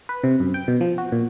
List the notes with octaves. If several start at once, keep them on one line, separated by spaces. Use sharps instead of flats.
B4
C3
F#2
G5
B2
F3
F#4
A#2